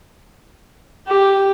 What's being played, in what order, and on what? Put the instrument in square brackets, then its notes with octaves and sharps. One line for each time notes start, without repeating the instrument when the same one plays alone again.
[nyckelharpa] G4